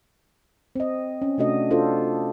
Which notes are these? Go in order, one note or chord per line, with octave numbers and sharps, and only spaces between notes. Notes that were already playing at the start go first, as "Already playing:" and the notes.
C4 D#5
C#4
C3 A3 D4 F#4 D#5
D4 F4 F#4 A4 C5